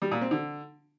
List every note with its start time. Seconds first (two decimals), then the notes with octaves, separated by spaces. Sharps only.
0.02 G3
0.11 A#2
0.21 C4
0.31 D3